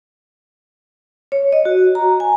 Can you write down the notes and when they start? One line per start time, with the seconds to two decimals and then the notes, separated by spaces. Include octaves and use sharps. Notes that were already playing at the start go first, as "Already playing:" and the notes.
1.32 C#5
1.52 D#5
1.65 F#4
1.95 A#5
2.20 G#5